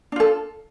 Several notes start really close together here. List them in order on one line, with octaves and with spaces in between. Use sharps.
D4 F4 A4